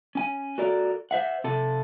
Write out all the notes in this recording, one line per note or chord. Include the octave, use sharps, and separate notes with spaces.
C#4 G#5
F#4 A4 A#4 D5
C5 E5 F#5
C3 A4